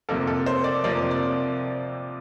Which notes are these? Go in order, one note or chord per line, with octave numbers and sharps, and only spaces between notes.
F2 C3 F3 A#3 A4
A4
C5
D5
F2 C3 F3 A#3 D5
D5